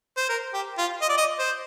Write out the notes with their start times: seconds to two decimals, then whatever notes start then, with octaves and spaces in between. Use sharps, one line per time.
0.17 C5
0.29 A#4
0.53 G4
0.78 F4
1.02 D#5
1.09 D5
1.17 D#5
1.39 C5